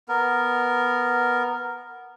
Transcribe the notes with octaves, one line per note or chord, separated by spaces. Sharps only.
B3 A#4